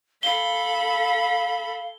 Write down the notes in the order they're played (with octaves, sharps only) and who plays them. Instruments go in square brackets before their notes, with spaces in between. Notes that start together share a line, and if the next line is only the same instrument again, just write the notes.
[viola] A4 B5 [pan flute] F5 [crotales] G7